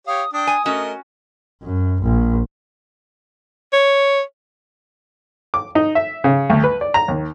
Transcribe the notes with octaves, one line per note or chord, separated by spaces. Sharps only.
G4 C#5 F5 D#6
D4 G5 D#6
G#5
A3 C#4 F#4 A#4 D#5
F#2
A#1
C#5
D6
D#4
E5
C#3
D2
B4
D5
A#5
D#2